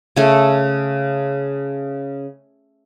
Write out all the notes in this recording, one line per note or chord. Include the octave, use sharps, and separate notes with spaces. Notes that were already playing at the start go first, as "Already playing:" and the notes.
C#3 A3